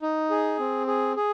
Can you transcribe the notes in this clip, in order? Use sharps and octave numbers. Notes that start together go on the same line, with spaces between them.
D#4
G#4
C4
G#4
G#4